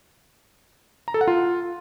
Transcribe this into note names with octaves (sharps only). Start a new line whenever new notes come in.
A#5
A4
F#5
F4